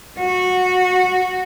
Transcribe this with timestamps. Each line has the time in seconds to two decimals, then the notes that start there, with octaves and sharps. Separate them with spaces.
0.19 F#4